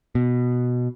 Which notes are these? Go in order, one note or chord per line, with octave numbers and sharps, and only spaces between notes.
B2